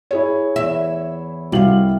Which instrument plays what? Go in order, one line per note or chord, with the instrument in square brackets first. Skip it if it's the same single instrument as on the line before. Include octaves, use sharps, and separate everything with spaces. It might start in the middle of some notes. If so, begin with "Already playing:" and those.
[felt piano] E4 G#4 C#5
[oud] E2 E5
[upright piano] C2 F#4 F#7 [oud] C3 F5